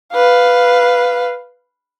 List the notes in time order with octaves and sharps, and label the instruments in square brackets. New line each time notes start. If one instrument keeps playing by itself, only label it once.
[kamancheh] B4 F5